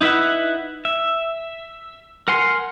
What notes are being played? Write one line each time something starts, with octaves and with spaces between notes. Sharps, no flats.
D#4 E4 B4 E5 F#5
E5
A#4 F#5 G#5 C6